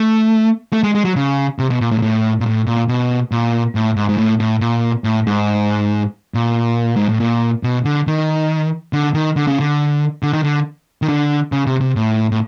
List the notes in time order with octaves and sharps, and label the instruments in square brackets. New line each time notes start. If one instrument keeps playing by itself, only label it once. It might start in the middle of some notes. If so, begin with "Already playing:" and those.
Already playing: [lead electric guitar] A3
A3
G#3
G#3
F#3
C#3
C3
B2
A#2
A2
A#2
A2
A#2
A2
A#2
B2
A#2
A2
G#2
G#2
A2
A2
A#2
A2
G#2
A#2
G#2
A2
A#2
B2
D3
D#3
D3
D#3
D3
C#3
D3
D3
D#3
D3
D#3
D3
C#3
C3
C3
A2
A2